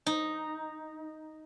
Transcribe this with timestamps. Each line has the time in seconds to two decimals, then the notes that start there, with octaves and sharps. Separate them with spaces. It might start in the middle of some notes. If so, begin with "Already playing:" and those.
0.07 D#4